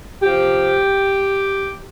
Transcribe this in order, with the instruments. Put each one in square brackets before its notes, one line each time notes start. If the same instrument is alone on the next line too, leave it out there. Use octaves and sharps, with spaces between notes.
[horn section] C3 F3 G4